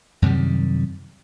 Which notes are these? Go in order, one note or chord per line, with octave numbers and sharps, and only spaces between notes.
F#2 C3 D#3 G3